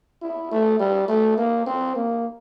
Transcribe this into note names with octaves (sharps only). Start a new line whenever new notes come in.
E4
A3
G3
A3
A#3
C4
A#3